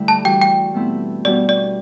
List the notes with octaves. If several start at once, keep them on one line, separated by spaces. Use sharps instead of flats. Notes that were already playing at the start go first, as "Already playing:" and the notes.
Already playing: D3 G3 A3 E4
A5
E3 G3 D4 F#4 G5
G5
B2 A3 C4 E4
B2 G3 D4 F#4 D5
D5